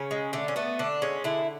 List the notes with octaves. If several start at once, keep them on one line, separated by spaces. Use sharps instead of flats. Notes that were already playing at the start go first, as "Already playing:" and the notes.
Already playing: C#3 C#4
G#3
D3 A3
C#4
A3 B3
D3 D4
G#3 C#4
D3 E4